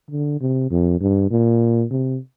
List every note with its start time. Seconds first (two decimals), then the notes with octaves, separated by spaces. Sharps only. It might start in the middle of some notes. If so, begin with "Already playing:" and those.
0.11 D3
0.41 C3
0.71 F2
1.00 G2
1.31 A#2
1.91 C3